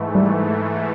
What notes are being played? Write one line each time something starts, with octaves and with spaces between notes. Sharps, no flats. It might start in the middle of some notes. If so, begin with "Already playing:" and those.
Already playing: G#2 E3 A3
G3